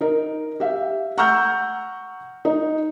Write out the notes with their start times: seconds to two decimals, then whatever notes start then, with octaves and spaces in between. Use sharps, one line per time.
0.01 D#4 A#4
0.60 G4 E5 F5
1.18 F#5 A#5 C#6 E6 F6 G6
2.45 D#4